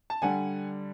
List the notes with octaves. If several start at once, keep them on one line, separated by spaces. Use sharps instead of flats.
A5
D3 G3 F#5 G#5